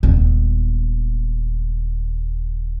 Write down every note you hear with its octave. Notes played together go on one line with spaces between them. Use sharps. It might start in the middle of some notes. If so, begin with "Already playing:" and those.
D#1 B3